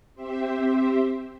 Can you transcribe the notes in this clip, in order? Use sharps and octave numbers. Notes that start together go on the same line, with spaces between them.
C4 G4 C5 E5